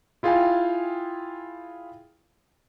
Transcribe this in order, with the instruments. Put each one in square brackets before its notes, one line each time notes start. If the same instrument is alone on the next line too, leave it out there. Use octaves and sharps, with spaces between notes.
[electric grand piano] E4 F4 G#4 F5 G5 G#5